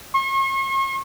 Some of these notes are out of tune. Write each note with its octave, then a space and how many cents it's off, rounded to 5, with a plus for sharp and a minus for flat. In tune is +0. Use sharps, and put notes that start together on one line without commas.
C#6 -45